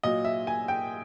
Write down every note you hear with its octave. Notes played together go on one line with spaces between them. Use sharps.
A#2 F#3 D#5
E5
G#5
G5